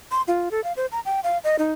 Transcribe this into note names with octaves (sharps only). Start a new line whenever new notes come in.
C6
F4
A4
F5
C5
A#5
G5
F5
D#5
D#4